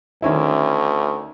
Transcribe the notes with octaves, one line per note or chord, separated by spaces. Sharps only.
D2 D#3 C#4 E4